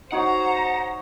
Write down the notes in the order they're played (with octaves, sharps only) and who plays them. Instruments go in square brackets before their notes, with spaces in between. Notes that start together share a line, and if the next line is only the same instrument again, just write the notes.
[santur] D#4 F#4 C#5 [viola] C5 A#5 [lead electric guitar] F#5